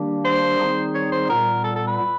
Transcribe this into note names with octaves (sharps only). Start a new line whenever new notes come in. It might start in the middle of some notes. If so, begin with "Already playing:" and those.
Already playing: D#3 G3 A#3 D4 G4
C5
D#3 G3 C4 D#4 G#4
C#5
C5
A#2 G3 B3 A#4
A4
A4
B4